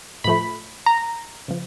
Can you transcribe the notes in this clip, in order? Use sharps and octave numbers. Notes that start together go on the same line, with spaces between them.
A2 F3 A3 B5
A#5
C#3 F3